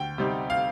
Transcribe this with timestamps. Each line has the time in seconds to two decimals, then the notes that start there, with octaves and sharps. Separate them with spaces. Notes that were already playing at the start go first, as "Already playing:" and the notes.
Already playing: D2 G5
0.18 C3 G3 C4 D#4
0.50 F5